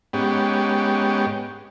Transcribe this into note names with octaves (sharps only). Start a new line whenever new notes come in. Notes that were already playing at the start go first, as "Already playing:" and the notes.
G#2 B3 C#4 G4